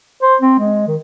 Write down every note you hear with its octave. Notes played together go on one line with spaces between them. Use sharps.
C5
C4
G#3
D#3